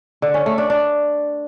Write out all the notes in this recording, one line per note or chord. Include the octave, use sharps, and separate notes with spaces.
D3
C#4
A3
D4
D4